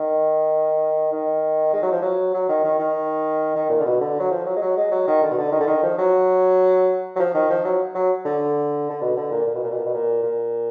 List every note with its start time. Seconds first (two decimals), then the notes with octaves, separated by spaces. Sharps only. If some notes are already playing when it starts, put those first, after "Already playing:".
Already playing: D#3
1.12 D#3
1.73 G#3
1.83 F#3
1.92 F3
2.02 F#3
2.34 F#3
2.49 D#3
2.64 D#3
2.79 D#3
3.55 D#3
3.70 A#2
3.80 D3
3.85 B2
4.01 D3
4.19 F#3
4.31 F3
4.46 F#3
4.56 G#3
4.61 F#3
4.77 G#3
4.91 F#3
5.07 D#3
5.23 D3
5.31 B2
5.38 D3
5.52 D#3
5.60 D3
5.67 D#3
5.83 F3
5.98 F#3
7.16 F#3
7.19 F3
7.34 D#3
7.50 F3
7.65 F#3
7.95 F#3
8.25 D3
8.90 D3
9.01 B2
9.17 D3
9.31 A#2
9.46 A#2
9.55 B2
9.63 A#2
9.71 B2
9.78 A#2
9.86 B2
9.94 A#2
10.23 A#2